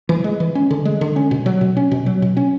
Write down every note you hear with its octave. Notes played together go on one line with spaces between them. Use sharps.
E3
G#3
E3
C#4
D3
G#3
D3
C#4
B2
F#3
B2
C#4
B2
F#3
B2
C#4